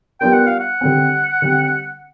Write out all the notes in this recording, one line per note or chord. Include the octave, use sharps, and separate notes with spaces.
G3 B3 D4 F4 A#4 G5
F#5
F5
F#5
D3 G3 C4
D3 G3 C4